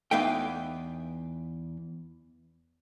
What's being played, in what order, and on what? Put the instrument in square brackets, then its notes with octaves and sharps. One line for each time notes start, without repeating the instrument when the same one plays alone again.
[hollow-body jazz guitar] E2 B3 D#4 E5 F5 G5